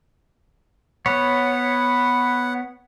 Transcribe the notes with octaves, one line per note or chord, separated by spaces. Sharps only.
B3 C#5 F#5